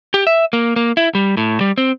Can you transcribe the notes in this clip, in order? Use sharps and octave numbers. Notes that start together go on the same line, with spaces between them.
G4
E5
A#3
A#3
E4
G3
A2
G3
C4